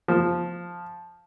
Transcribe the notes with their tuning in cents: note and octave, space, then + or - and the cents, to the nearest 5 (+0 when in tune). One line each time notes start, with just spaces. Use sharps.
F3 +5